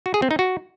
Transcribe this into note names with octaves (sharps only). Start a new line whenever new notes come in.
F#4
G#4
C4
D#4
F#4